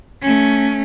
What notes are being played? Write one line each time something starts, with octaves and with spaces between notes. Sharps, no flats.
A3 C#4